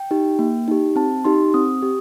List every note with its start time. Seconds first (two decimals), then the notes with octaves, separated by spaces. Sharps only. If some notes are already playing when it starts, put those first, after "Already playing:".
Already playing: G5
0.11 D#4 G4
0.39 A#3
0.68 D#4 G4
0.96 C4 A5
1.25 D#4 G4 C6
1.54 C4 D#6
1.83 G4